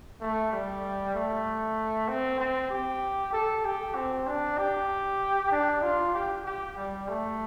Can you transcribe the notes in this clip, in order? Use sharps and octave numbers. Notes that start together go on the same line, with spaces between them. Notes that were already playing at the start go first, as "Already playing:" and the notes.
A3
G3
A3
C4
C4
G4
A4
G4
C4
D4
G4
D4
F4
G4
G4
G3
A3